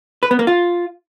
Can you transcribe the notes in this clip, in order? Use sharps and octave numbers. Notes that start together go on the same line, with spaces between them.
B4
B3
A#3
F4